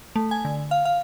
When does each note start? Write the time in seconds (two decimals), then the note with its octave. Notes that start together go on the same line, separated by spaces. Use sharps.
0.16 A3
0.31 G#5
0.45 D3
0.71 F5
0.85 F5